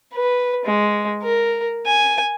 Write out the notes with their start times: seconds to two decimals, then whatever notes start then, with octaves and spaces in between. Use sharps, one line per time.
0.14 B4
0.65 G#3
1.23 A#4
1.86 G#5